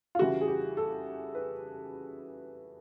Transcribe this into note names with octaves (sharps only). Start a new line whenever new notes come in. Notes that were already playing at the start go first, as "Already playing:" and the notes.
F4
C#3 E3 G3 F#4
G#4
G4
A4
B4